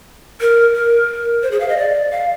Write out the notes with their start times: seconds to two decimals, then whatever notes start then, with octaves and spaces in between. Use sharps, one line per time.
0.41 A#4
0.75 A#4
1.43 C5
1.51 G#4
1.60 F5
1.69 D#5
1.77 D5
2.11 F5